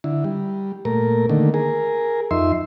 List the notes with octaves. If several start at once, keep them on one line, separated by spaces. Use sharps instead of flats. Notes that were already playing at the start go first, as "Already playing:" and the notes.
D3 E4
G3
A#2 A3 A#4
D3 D#3 A3 A#3
G#4 A#4
F2 D#4 E5 C6